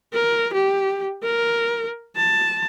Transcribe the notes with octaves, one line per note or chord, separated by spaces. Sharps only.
A#4
G4
A#4
A5